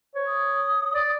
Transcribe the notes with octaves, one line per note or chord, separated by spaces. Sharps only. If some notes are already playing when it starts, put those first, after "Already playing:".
C5 C#5
D#6
D5